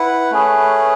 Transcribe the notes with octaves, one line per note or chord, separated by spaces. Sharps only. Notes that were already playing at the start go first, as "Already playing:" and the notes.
Already playing: E4 B4 F#5
A3 C#4 G#4 B4